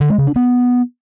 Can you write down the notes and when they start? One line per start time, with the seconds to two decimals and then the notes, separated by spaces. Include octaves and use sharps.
0.01 D3
0.09 G#3
0.18 C#3
0.27 D4
0.36 B3